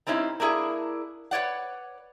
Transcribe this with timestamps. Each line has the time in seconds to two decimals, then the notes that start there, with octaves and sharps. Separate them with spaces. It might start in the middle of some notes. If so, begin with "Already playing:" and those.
0.07 G3 C4 C#4 D#4 E4
0.40 A#3 D4 E4 G#4
1.31 B4 C#5 D5 F#5